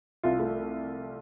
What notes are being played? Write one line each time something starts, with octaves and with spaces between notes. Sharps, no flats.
C2 F4
A3